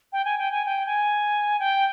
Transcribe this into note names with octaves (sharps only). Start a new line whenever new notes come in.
G5
G#5
G5
G#5
G5
G#5
G5